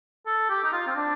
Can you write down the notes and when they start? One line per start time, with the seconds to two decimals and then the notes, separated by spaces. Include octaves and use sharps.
0.26 A4
0.49 G4
0.64 D#4
0.73 F4
0.87 C4
0.95 D4